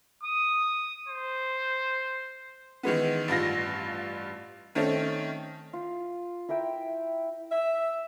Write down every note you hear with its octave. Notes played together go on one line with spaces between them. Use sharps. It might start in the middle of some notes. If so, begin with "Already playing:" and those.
D#6
C5
D#3 E3 G#3 B3
A1 G2 F4 A#6
D#3 A3 C4 C#4
F4
E4 A#4 E5 G5
E5